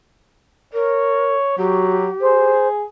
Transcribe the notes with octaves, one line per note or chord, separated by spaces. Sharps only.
A#4 C#5
F#3 F#4 G4
G#4 C5